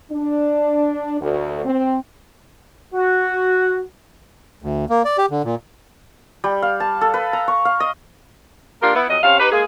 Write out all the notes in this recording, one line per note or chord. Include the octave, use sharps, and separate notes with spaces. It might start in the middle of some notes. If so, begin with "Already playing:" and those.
D4
D2
C4
F#4
D2
A#3
D5
G4
D3
A#2
G3
F5
A5
A4
B4
A#5
C#6
F5
D#5
A#3 D4 F4 G4 A#4
B3 E4
F2 F#3 D#5
C3 C#4 C5 F5
D#4 G4 B4
G#3 A#3 G#4